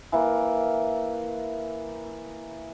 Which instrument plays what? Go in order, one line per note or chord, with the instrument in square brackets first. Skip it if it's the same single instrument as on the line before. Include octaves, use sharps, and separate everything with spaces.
[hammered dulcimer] E3 A#3